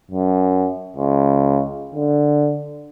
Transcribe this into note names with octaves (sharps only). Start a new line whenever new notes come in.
F#2
C#2
D3